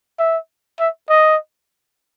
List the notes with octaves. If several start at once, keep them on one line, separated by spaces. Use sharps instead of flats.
E5
E5
D#5